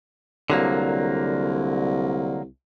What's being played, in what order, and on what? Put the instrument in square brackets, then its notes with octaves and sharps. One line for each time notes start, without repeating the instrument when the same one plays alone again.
[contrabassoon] C2 [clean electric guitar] D3 F#3 A#3